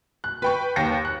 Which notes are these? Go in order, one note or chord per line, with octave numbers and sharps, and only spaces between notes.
F#6
B4 G5 C#6
D#2 G5 A#6 C#7
F#6